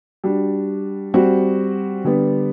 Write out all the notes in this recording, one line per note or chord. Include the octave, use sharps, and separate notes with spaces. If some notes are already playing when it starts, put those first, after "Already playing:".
G3 D4 F#4
G3 C4 F#4
D3 G3 B3